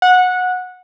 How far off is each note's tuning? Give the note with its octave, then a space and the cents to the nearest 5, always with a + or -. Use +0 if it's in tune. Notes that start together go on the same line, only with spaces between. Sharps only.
F#5 -20